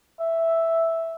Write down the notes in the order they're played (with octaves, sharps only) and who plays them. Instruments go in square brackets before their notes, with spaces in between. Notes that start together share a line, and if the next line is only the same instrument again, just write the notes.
[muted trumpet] E5